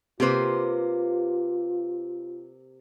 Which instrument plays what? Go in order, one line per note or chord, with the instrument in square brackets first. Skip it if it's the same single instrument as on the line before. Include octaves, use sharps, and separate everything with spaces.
[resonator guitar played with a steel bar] C3 A#3 C5 [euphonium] F4 [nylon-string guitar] G4 B4